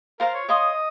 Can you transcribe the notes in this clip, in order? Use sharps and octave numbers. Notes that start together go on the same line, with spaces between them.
F4 A#4 C5 F5
C#5
C#5 D#5 F5 C6 D#6